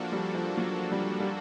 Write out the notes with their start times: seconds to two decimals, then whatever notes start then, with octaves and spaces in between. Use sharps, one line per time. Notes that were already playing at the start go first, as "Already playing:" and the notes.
Already playing: F3 A#3 D4 F#4 A4
0.12 G3
0.35 F3
0.57 F#3
0.92 G3
1.20 G3